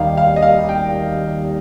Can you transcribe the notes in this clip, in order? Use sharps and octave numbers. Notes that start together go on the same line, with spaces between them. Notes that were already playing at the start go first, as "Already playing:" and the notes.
Already playing: D#2 D#3 G3 F5
D#2 F5
D#5
F5
D#3 G3
G5